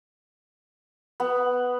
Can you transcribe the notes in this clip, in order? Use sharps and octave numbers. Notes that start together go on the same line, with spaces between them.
B3